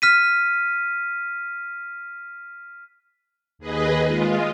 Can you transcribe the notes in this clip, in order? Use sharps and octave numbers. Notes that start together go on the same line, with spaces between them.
F6 B6 D#7
D#2 G#4 B4 D#5
G#3 F4